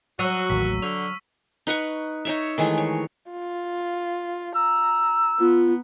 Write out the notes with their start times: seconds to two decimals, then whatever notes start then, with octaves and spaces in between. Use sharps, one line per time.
0.19 F#3 F#4 C#6 D#6 E6
0.50 A1 D#2 A2 B6
0.82 D3 C#5 F6
1.67 D#4 B4 F#5 C#6
2.25 D#4 C#5 E5
2.58 D#3 E3 G#3 A3
2.78 C#5
3.31 F4
4.56 A#5 E6
5.40 B3 F4